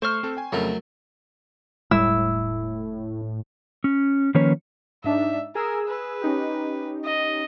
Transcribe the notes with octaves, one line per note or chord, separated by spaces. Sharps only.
A3 C5 C#6 F6
C4 A4
G5 G#5
F2 C#3 F#3 A3 A#4
E1 A2 G3 G#3 E4 E6
C#4
D#3 F3 A#3 C#4 B4 C#5
G#2 D4 D#4 E5
G#4 A#4 E6
B4
C#4 D#4 G4
D#5